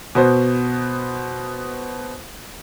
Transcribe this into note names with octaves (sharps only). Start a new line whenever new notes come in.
B2 B3 C5